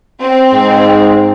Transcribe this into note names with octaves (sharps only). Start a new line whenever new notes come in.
C4
G#2